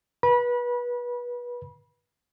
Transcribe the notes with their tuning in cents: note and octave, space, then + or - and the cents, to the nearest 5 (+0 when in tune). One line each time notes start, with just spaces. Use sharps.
B4 -25 B5 -30